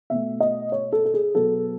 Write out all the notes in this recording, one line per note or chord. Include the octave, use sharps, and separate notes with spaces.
B2 A3 E5
D#5
C#5
A4
A4
G#4
B2 F#3 B3 A4